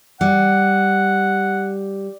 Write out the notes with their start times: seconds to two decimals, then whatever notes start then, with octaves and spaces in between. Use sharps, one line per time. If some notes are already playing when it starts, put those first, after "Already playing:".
0.21 G3 F#5